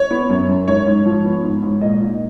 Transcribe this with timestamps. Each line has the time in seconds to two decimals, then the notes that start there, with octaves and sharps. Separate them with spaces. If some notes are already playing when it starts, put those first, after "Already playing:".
Already playing: C#5
0.11 B3
0.30 F#2
0.48 F#2
0.68 G#2 C#5
0.87 G#2
1.06 F3
1.25 B3
1.43 G#2
1.63 G#2
1.81 A#2 D#5
2.00 A#2